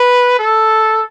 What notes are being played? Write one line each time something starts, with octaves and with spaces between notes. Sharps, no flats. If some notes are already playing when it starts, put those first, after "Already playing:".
Already playing: B4
A4